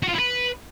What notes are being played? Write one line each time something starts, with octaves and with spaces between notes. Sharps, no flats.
F#4
F4
E4
B4